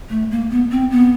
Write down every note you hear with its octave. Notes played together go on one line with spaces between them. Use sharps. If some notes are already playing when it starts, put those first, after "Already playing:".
A3
A#3
B3
C4
B3